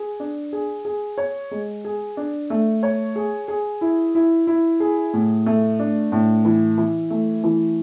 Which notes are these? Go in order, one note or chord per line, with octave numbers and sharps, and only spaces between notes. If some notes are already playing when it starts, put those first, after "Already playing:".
Already playing: G#4
D4
G#4
G#4
C#5
G#3
G#4
D4
A3
C#5
G#4
G#4
E4
E4
E4
G#4
A2
A3
D4
A2
E3
E3
A3
E3